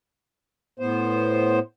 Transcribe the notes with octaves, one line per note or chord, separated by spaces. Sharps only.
A2 B3 C5